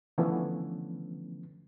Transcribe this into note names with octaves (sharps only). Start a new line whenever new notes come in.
D3 E3 F3 A3 B3 C#4